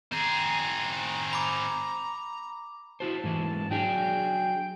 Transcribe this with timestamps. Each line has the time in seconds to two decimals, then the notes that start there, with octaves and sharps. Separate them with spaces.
0.12 C4 G#4 A#5
1.33 B5 D6
3.00 E4 F#4 C5 A5
3.24 G#2 E3 G#3
3.71 F#3 D4 G#4 G5